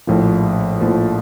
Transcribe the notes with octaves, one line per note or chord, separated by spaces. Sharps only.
A#1 A2 F3 A#3
A#1 A2 F3 A#3